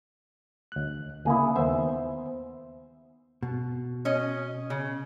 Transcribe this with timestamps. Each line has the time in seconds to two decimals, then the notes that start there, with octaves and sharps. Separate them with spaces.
0.72 D2 F#6
1.26 D2 C#3 A#3 E4 G#4
1.56 D#2 B3 C5 E5
3.43 B2
4.05 C#4 D#5
4.70 C#3